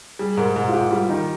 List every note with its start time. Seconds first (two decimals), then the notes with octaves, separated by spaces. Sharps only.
0.19 G3 G#4
0.37 G#2 A#4
0.56 G#2
0.68 F4
0.73 G#2 G4
0.91 G3 F4
1.09 D#3 D#4